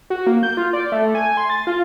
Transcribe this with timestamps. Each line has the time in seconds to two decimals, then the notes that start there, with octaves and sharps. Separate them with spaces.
0.10 F#4
0.27 A#3
0.43 G6
0.57 F4
0.73 D5
0.92 A3
1.15 G#5
1.37 C6
1.50 A6
1.67 F4